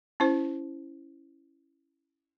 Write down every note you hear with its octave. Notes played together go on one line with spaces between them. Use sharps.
C#4 E4 C5